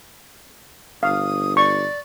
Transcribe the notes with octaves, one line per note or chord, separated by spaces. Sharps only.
G1 F5 D#6
D5 C#6